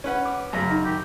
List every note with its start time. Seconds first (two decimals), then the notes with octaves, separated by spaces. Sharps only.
0.04 C#4 B4 F#5
0.25 D6
0.53 F#2 C#3 A#5
0.70 D#4
0.85 D#3 G4